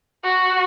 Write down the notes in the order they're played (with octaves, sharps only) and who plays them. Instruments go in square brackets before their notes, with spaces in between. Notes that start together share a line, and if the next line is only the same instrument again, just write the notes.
[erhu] F#4